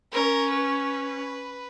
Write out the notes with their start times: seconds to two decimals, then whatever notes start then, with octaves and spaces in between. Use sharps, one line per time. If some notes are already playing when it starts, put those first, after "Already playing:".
0.12 C#4 A#4
0.50 B4